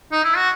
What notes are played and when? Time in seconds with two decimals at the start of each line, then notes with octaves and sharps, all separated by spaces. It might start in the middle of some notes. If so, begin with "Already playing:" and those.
0.12 D#4
0.24 E4
0.37 F#4